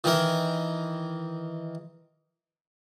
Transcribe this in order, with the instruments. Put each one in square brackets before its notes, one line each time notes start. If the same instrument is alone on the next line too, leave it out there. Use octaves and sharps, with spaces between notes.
[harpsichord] D#3 E3 A#4